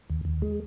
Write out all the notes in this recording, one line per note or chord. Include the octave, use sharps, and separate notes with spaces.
D#2
D#2
G#3